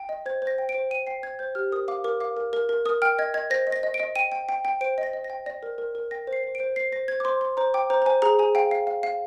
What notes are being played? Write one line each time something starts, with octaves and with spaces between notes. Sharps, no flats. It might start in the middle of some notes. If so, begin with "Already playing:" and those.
Already playing: G5
D#5
C5 G#6
C5
A#6
G5
D7
C5
G5 D#7
G5 C7
C5 G#6
C5 G6
G4 F6
A#4 D#6
F5 D6
A#4 D6
F5 D6
A#4
A#4
A#4
A#4 D#6
G5 F6
D#5 G#6
D#5 G#6
C5 A#6
D#5
A#6
D#5
D7
D#5
G5 D#7
G5
G5
G5
C5 D7
D#5
A#6
D#5
A#6
G5
D5 A#6
A#4
A#4
A#4
G5 A#6
C5
C7
C5
C5 D7
C5 C7
C5 A#6
C5 G#6
D6
C5 C6
C5 C6
C5 A#5
G5 D6
C5 A#5
A#5
C5 G#5
G#4 A#5
G#4 G#5
F5 G5
F5
F5
F5